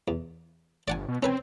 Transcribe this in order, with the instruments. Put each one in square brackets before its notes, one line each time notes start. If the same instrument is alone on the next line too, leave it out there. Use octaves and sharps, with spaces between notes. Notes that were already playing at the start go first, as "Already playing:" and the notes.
[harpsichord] E2
[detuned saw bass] G1 [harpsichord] D5 F#5 G#5
[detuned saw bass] B2
[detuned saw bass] C4 [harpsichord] C#4 B4 G#5